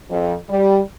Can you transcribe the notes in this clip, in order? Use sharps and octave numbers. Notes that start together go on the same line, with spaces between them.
F2
G3